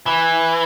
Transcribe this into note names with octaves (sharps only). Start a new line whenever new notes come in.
E3